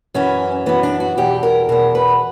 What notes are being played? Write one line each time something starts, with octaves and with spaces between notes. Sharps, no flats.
F#2 E3 C#4
F#2 E3 B3
D4
F#4
E2 B2 G4
A#4
E2 B2 A#4
B4